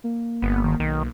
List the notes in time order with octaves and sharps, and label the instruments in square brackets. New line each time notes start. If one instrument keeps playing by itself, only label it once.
[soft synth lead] A#3
[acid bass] G1 [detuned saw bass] B3
[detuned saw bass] D#3
[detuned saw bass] B1 [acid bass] D#3